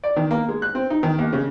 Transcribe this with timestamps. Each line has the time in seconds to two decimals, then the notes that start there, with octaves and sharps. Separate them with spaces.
0.04 D5
0.16 D#3
0.31 A#3
0.49 G#3
0.62 F#6
0.75 C4
0.90 D#4
1.03 D#3
1.18 D#2
1.33 C#3